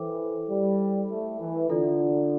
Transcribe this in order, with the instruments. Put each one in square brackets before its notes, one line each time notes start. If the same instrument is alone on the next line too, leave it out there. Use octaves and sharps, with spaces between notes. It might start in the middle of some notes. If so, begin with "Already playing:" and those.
Already playing: [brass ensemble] E3 [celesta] E4 A4 C5 G5 D6
[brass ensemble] G3
A3
E3
[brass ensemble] D3 [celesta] F4 A4 D5